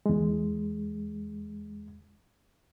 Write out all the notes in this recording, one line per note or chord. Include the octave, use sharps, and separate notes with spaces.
E2 G#3